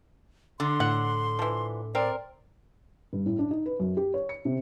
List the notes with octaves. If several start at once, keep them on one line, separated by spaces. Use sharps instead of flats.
D3 C6
A2 F#5
E3 F3
C4 A#4 D5
G2
A2
D4
D#4
B4
F#2
G4
C#5
C#7
C3